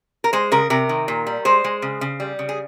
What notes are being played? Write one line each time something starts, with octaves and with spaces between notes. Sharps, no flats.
A#4
G#3 C5
C#3 A#4
C3 A#4
D#3
A#2
G3
G#3 C5
G#3
C#3
C#3
G3
C#3
G#4